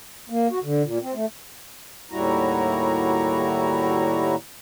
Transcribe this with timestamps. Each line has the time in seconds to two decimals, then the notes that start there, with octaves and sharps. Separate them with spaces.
0.30 A#3
0.51 F#4
0.64 D3
0.83 A#2
1.02 C4
1.14 A3
2.12 D#2 A2 G3 E4 F#4 A#5